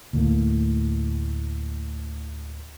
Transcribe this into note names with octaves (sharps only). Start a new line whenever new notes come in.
D2 A2 A#3